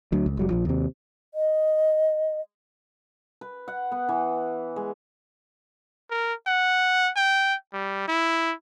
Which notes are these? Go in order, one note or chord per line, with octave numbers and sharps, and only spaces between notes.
D2 F#3
C#2
F1 F#3 G3
A#1 F3
D#2 C3
D#5
B4
F#5
B3
E3
G#3
A#4
F#5
G5
G3
E4